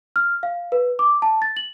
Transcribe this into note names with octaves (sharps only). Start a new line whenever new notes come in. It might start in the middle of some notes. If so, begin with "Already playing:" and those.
F6
F5
B4
D6
A5
A6
F#7